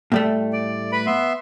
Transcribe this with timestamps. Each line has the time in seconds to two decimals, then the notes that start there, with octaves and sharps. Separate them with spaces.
0.12 A2 G3 A3
0.53 D5
0.92 B4 B5
1.07 B3 E5 C6